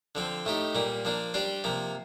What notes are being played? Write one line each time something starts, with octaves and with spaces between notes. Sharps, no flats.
D3 F3 C4
A2 A3 D#4 G4
A#2 G3 A#3
F3 A#3 D4
G3 D4 G4 C5
C3 F3 A#3